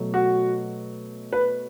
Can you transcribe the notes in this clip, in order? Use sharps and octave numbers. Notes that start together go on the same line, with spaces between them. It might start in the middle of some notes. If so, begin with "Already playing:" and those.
Already playing: B2 F#3 A3
F#4
B4